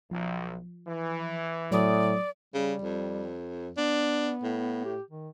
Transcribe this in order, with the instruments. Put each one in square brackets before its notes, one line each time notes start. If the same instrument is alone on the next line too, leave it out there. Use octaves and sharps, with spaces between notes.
[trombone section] B1 [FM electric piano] F3
[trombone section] E3
[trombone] A2 [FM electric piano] F#3 D#6 [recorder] D5
[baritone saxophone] C#3 [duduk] G3
[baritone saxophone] F2
[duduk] B3 [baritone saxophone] D4
[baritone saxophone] A2
[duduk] G4
D#3